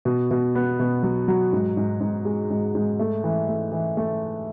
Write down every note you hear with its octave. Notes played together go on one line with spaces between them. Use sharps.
B2
B2
B3
B2
F#3
F#3
G#2
G#2
G#2
G#3
G#2
G#2
A3
E3
A3
E3
A3